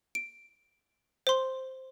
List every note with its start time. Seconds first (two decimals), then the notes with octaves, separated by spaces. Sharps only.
0.15 D7
1.27 C5 C6